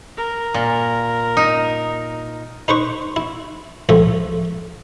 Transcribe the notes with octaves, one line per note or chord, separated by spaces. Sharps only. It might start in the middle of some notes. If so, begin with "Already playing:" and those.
A#4
A#2
D#4
D#4 B4 C5 C#6
E4
C#2 A2 F3 A3 A4